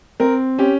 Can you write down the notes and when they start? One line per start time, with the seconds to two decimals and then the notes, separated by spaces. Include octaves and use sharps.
0.20 C4 A#4
0.59 C#4 G4